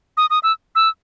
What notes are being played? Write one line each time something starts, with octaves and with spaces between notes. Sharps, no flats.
D#6
D#6
E6
E6